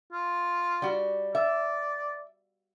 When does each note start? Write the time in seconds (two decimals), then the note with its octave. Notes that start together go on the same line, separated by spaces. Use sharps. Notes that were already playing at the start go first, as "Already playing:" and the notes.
0.12 F4
0.82 G3 F#4
1.35 D5 E5